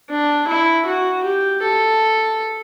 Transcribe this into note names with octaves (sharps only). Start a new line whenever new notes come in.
D4
E4
F#4
G4
A4